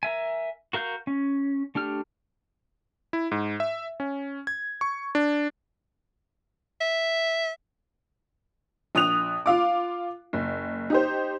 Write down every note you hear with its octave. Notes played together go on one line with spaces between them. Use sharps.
A#4 E5 G#5
F#4 A#4 F5 F#6 G6
C#4
A3 D4 G4 F6
E4
G#2
E5
C#4
G#6
C#6
D4
E5
A#1 D#6 F#6 F7
F4 F5 D6
F#1
D#4 G4 C5